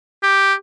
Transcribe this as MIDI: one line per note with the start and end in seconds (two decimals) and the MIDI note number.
0.23 0.54 67